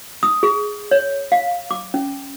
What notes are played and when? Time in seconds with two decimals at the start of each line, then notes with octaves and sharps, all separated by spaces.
0.23 D#6
0.43 G#4
0.91 C#5
1.32 F5
1.71 D6
1.94 C#4